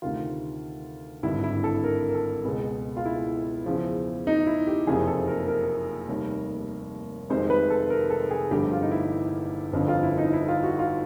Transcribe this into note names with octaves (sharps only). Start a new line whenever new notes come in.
D2 C3 D#3 F4
G#1 G2 D3 E4
E4
A4
A#4
A#4
A4
C#2 B2 G#3 B3
F4
E4
E2 C#3 F3
D#4
E4
G4
F#1 F2 C3 F3 A#3 G#4
A4
A#4
A#4
F1 D#2 D#3 G3
F1 F2 C3 D#3 G#3 C5
B4
A4
A#4
A4
G#4
G1 G2 D3 F3 A3 G4
F4
D#4
E4
G1 F2 D3 F3
F4
E4
D#4
E4
F4
F#4
F4